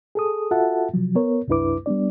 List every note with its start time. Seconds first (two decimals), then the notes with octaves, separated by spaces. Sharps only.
0.15 G#4 A4 D#6
0.51 F4 F#4 A4 E5 F#5 A5
0.94 C3 F3 F#3
1.15 B3 A#4 C#5
1.48 C2 F#2 D4 E4 B4 D6
1.86 G3 B3 D4 D5